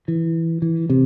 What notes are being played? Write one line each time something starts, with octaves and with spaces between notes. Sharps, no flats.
E3
E3
C3